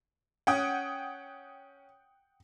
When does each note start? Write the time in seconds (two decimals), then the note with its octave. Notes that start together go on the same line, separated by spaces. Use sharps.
0.47 C#4 F#5 G5 D#6